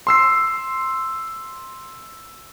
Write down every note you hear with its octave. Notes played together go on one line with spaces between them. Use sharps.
C6 E6 C7